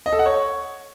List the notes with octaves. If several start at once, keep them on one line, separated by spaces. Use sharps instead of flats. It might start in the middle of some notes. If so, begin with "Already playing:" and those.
D#5
A4
F#5
C#5